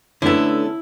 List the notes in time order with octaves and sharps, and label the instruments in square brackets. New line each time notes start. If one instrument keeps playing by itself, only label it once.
[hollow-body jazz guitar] D3 A3 B3 [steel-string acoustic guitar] C#4 A4 [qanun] E4